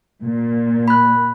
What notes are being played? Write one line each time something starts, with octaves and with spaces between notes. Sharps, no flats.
A#2
B5 F#6